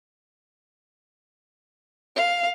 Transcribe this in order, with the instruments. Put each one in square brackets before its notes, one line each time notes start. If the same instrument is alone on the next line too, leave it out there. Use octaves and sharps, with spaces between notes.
[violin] F5